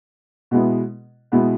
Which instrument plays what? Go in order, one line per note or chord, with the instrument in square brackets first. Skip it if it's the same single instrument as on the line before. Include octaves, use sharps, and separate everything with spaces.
[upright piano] B2 G#3 B3 E4
B2 G#3 B3 E4